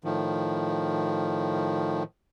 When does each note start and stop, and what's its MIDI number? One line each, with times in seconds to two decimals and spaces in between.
0.04 2.03 45
0.04 2.03 51
0.04 2.03 53